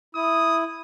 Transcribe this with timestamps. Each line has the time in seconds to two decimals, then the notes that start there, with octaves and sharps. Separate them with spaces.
0.15 E4 D#6